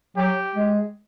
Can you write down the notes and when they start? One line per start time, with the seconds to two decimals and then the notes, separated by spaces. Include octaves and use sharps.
0.16 F#3 G4
0.55 G#3